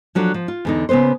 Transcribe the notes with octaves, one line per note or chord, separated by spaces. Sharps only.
F3 F#3 D4 A4
F3
F4
E2 D3 D#4
C#3 A#3 B3 B4 C5